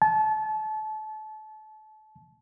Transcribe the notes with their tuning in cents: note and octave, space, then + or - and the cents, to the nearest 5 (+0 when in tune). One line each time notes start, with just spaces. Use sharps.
A5 -30